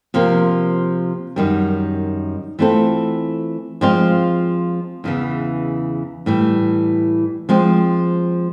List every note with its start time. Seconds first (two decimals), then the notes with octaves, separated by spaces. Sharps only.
0.14 C3 F3 A#3
1.36 F#2 D#3 G3
2.59 E3 A3 C4 F4 A4
3.81 F3 G#3 C4 F4
5.04 E2 C#3 E3
6.26 A2 E3 G3
7.49 F3 G#3 C4